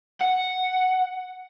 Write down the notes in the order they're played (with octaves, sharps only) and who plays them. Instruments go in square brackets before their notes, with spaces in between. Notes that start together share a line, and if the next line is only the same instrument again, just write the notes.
[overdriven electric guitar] F#5